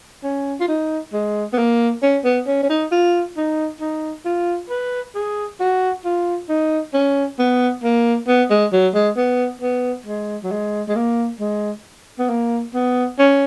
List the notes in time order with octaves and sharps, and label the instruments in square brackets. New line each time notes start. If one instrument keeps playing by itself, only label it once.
[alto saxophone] C#4
F4
D#4
G#3
B3
A#3
C#4
B3
C#4
C#4
D#4
F4
D#4
D#4
F4
B4
G#4
F#4
F4
D#4
C#4
B3
A#3
B3
G#3
F#3
G#3
B3
B3
G#3
F#3
G#3
G#3
A#3
G#3
B3
A#3
B3
C#4